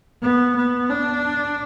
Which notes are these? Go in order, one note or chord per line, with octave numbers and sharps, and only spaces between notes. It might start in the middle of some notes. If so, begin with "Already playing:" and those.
B3
B3
D4